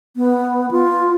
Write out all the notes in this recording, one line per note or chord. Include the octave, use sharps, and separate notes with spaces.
B3
F4